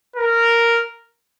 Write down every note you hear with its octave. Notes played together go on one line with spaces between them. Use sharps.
A#4